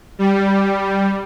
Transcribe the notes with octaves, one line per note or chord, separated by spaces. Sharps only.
G3